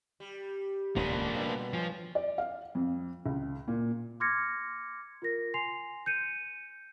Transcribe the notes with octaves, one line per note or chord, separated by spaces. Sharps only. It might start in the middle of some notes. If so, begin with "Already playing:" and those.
G3
D#1 C#2 A#2 A#3 B3 D4 B5 C6
B2 D3 G3 B4
F3 G#3 C#5 G#5
D5
F5
F2
C#2
A#2
C6 D6 F6 G#6 A#6 C#7
F4 A#4 A#6
G#5 C6 C7 F7
G6 C#7 D#7